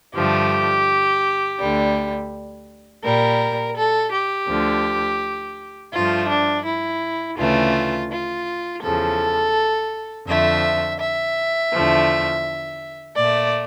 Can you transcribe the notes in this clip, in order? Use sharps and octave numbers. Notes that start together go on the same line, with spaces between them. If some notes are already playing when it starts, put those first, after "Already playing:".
G2 D3 F3 A3 G4
D2 D3 G3
A#2 G3 A#4
A4
G4
D2 D3 F3
G2 F3 A3 F4
D4
E4
D2 C#3 E3 A3 F4
F4
E2 C#3 F3 A4
F2 D3 F3 A3 E5
E5
E2 D3 F3 A3
A#2 A3 D5